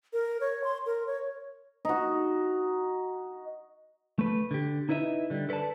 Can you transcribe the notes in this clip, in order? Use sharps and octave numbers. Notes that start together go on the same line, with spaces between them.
A#4
C#5
C6
A#4
C#5
D#4 F#4
A3 B4
D3 G4
D#4 E4 B4 D#5 E5
D3 G3
A4 B4 C#5 D5 A5